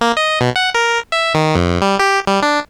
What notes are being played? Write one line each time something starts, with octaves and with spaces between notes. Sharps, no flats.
A#3
D#5
B2
F#5
A#4
E5
D#3
F2
G3
G4
G3
D4